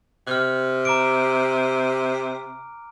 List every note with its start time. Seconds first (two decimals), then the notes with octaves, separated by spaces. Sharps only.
0.27 C3 F6 F#6
0.85 A#5 D6 D7